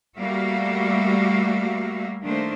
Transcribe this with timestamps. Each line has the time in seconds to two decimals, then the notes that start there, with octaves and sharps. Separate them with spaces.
0.17 G3 A3 A#3 F#4 E5 F5
2.23 D#3 A3 A#3 D4 C5